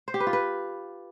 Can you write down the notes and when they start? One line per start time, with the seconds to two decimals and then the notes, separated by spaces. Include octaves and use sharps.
0.08 C5
0.14 G4
0.20 B4
0.27 F4
0.33 B4